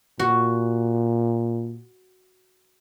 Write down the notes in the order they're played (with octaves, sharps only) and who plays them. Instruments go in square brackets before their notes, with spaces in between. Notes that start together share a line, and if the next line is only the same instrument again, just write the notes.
[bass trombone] A#2 [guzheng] F#4